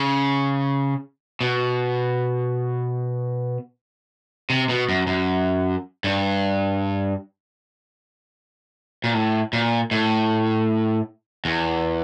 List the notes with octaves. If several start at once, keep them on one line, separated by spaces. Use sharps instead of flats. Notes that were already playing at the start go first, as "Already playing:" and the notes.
Already playing: C#3
B2
C3
B2
F#2
F#2
G2
A#2
A2
A#2
A2
E2